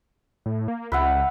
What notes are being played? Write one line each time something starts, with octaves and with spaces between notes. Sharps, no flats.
A2
A#3
C#2 B4 E5 F#5